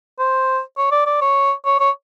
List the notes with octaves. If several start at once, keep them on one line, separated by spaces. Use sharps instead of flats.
C5
C#5
D5
D5
C#5
C#5
C#5